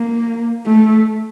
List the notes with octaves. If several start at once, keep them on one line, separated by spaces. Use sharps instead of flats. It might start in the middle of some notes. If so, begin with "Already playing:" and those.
Already playing: A#3
A3